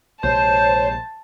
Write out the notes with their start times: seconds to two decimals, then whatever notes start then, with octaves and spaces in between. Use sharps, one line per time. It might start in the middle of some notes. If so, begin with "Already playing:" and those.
0.23 A#1 C3 G#3 C5 C#5 A5